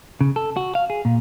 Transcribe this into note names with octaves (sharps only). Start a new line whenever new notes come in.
C#3
A4
F#4
F5
G#4
A#2